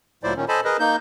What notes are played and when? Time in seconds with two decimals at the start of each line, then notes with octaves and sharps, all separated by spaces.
0.23 D2 A#2 F#3 E4 C5 D5
0.36 A#2 D#3 C#4
0.48 A4 C5 D#5 G#5 A5 B5
0.64 G#4 A#4 B4 D#5
0.80 A#3 D#4 G6